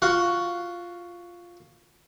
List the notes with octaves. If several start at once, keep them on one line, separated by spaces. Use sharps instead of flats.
F4 F#4